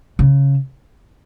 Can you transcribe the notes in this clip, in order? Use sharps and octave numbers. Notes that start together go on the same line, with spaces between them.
C#3